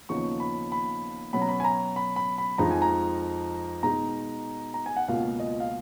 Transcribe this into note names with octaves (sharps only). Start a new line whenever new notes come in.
D#2 C#3 F3 B3 D#4 C#6
B5
B5
B2 F#3 C#4 B5
A#5
B5
G#5
A#5
B5
B5
B5
F2 F3 G#3 D#4 A#5
G#5
A#5
B2 G#3 D#4 A#5
A#5
G#5
F#5
C#2 B2 A#3 F4 F5
D#5
F5